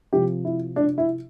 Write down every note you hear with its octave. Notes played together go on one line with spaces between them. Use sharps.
C3 F3 G4
E4
D4
E4